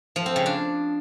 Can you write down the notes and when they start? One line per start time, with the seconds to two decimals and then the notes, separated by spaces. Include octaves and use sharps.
0.16 F3
0.26 C4
0.36 C#3
0.46 D4